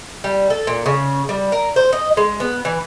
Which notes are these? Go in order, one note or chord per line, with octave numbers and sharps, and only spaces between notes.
G3
A4
A#2
C#3
G3
A#4
C5
D#5
G#3
B3
E3